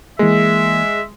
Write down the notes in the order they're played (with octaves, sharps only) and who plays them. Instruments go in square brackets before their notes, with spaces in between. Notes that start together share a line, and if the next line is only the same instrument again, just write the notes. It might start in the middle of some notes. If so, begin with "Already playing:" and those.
[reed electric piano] E3 A#3 [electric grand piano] G#3 [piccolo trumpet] E5